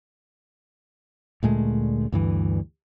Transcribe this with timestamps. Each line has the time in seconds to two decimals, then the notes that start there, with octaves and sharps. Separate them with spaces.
1.43 D2 A#2 G#3 A3
2.12 D2 G2 E3